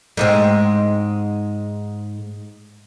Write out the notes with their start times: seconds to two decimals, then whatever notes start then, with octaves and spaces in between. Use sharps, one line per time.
0.17 G#2 G#3 C4